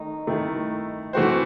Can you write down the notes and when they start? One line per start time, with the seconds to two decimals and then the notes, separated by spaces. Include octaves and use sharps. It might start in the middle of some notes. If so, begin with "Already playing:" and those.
Already playing: D#3 A3 D#4
0.27 D#3 A3 E4
1.13 E3 A3 C4 F#4 C5